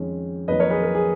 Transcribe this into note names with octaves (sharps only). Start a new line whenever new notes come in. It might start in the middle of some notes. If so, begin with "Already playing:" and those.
Already playing: F2 D#3 G#3 C#4
F2 D#3 F#3 A#3 B4 D#5
A#4 C#5
G#4 B4
A#4
G#4